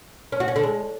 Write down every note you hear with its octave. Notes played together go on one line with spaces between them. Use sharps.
C#4
F#4
C#4
D3
G#3